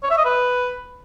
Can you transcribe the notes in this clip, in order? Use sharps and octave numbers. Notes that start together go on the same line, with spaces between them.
C#5
E5
D#5
B4